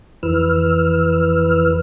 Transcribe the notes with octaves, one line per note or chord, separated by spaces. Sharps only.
F2 E3 B4 E6 F6